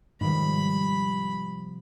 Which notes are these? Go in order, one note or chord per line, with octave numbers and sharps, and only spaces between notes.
G#2 C3 D#3 F3 G3 B5